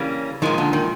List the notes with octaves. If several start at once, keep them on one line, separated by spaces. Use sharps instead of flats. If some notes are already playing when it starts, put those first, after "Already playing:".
Already playing: C#3 E3 G3 A#3 C#4
A#2 D#3 F3 G#3
D3
D#3